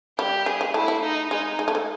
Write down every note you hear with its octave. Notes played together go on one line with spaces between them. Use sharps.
G3 G4
G3 G#4
G#3
A3 E4
A3
D#4
G#3 D#4
G#3
A3
G#3